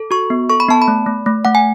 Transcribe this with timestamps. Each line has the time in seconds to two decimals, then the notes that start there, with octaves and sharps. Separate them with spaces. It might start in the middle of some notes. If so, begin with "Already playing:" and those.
Already playing: A4
0.11 F#4 C#6
0.30 B3
0.50 A4 C#6
0.60 B5
0.69 B3 A5
0.82 B5
0.88 A3
1.06 A3
1.26 A3
1.45 A3 F#5
1.55 G#5